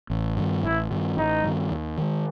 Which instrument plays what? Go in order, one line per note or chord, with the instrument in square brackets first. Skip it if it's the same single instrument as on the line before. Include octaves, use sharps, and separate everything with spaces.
[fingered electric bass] A1
G2 D#3
[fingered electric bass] A1 [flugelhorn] E4
[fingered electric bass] G2 D#3
[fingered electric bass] A1 [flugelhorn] D#4
[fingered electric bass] G2 D#3
D#2
D#3 G#3